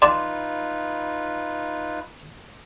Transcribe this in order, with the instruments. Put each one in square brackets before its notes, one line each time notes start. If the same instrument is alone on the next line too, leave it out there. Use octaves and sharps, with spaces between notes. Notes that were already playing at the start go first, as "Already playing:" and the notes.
[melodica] D#4 F4 B4 [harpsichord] D5 G5 A5 [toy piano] C6